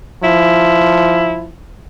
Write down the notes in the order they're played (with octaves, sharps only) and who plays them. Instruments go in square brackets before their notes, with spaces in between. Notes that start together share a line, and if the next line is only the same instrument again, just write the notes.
[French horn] F3 [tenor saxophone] E4